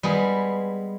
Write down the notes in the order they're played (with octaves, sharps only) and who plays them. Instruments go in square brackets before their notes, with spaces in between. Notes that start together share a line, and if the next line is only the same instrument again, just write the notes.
[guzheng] G3 G#3 B3 G#4